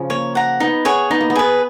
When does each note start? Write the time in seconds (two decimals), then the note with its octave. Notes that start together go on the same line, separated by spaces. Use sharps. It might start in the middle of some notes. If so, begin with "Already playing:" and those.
Already playing: C#3 F3
0.10 A#3 C#5
0.35 F#5 A#5
0.60 B3 D#4
0.85 G#4 C#5 F#5
1.11 B3 D#4
1.21 A#3
1.30 B3
1.35 G#4 B4